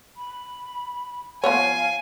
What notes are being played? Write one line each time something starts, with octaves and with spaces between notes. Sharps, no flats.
B5
F3 B3 C#5 F5 G#5